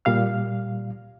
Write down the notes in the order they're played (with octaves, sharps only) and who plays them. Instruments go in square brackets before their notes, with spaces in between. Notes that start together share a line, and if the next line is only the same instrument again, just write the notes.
[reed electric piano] A#2 G3 F5 F6